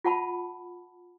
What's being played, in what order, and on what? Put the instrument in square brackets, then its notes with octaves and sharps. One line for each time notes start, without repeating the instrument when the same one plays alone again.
[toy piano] F4 F#5 A5 B5